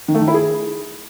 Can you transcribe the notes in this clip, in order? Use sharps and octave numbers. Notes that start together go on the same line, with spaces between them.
D#3
A3
D#3
E4
G#4